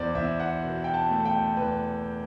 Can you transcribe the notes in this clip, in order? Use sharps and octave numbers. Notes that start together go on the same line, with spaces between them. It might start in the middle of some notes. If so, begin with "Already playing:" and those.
Already playing: E2 C5 D5
E2 E5
F#5
B2
G5
A5
A3
G5
E2 B4